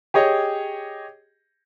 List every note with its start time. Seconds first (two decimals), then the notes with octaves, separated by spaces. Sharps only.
0.14 G4 G#4 C#5 D#5